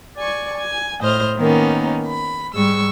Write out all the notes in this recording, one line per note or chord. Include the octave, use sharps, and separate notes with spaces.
D5 G#5 C#6
G#5
A2 C5 D#5 F6
D#3 A#3 B3 C#4 D#4
B5
G#2 G3 G#3 C#6 E6